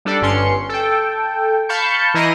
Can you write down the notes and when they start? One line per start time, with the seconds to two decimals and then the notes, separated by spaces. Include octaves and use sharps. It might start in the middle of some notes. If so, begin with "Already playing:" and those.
0.05 G3 D4 A4 D5
0.21 G1 G2 C#4 C6 C#7
0.69 A4 G5
1.69 F5 A5 B5 C#6 G6 C#7
2.14 E3 E4 D#5 A#5 C7 D#7